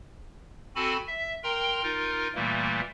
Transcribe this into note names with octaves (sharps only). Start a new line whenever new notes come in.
C4 F#4 A4 G#5 A5 B5
E5
A#4 G5 A#5 C6
D#4 F4 A#4
A#2 E3 G3 A3 A#3